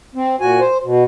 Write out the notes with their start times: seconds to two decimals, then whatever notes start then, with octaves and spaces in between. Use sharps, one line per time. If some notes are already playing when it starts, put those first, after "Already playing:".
0.15 C4
0.40 A#2 F#4 G#5
0.60 C5
0.84 B2